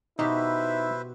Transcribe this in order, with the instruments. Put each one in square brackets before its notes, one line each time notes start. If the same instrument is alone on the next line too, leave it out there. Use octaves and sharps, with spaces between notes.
[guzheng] B2 G4 [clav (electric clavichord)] D#4 [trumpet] E4 [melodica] B4 C5 E5